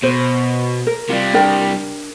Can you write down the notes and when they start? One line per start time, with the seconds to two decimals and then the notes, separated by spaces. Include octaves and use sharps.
0.03 B2 C5
0.87 A#4
1.10 C3 G3 F4
1.34 D4 A#4 G5